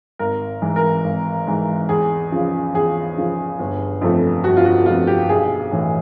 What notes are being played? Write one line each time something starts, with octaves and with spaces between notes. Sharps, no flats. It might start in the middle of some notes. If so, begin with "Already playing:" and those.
G#1 A#4
G#2 E3
A#4
G#1
G#2 E3
E2 G#4
C#3 F3
E2 G#4
C#3 F3
G1
F2 C3 F3 A3
G1 F#4
F4
F#4
F2 C3 F3 A3 F4
G4
B1 G#4
A2 E3